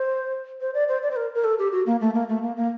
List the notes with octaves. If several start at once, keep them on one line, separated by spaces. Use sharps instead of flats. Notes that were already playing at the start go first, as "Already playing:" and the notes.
Already playing: C5
C5
D5
C5
D5
C5
A#4
A#4
A4
G4
F#4
A#3
A3
A#3
A3
A#3
A#3